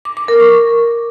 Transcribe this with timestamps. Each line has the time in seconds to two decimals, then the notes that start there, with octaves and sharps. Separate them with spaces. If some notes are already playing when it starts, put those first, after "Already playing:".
0.05 D6
0.17 D6
0.28 A#4
0.40 C#6